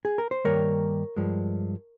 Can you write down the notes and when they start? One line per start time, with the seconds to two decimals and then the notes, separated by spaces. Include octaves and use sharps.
0.05 G#4
0.18 A#4
0.31 C5
0.44 G2 D#3 G3 A#3 A#4 C#5
1.16 G2 F3 G#3